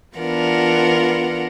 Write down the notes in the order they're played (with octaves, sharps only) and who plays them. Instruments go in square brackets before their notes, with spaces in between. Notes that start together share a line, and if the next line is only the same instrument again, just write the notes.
[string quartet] E3 B3 D4 F4 A#4 F#5